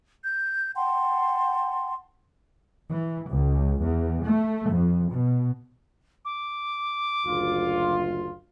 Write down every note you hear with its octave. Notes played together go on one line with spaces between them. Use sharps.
G6
F#5 G5 A5 C6
E3
C#2
E2
A3
F2
B2
D6
F#1 D2 F4